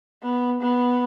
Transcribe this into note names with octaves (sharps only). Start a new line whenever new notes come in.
B3
B3